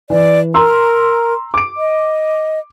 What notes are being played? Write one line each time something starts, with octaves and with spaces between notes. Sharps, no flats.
E3 D5
A#4 A#5 C6 E6
D6 D7
D#5